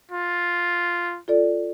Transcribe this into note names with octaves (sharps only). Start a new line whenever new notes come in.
F4
F4 A4 D5